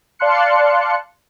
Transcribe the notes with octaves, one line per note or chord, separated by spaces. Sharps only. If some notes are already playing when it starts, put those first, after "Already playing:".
D5 F5 A5 C6 F#6 C#7